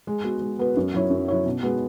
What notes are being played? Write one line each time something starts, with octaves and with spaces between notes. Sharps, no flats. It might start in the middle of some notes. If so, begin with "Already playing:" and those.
G#3
B3 F#4 B4
G#3
B3 F#4 B4
F#2
F#3 E4 C#5
F#2
F#3 E4 C#5
B2
G#3 B3 F#4